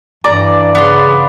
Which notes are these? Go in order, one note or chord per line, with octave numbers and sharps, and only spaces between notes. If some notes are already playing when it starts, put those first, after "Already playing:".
G2 E3 D5 A#5
C#3 B3 C6